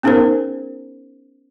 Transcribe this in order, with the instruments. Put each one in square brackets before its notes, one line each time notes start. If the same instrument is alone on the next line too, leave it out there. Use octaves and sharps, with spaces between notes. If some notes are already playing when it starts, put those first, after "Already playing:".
[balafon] B3 C#4 D#4 G#4 A#4 C5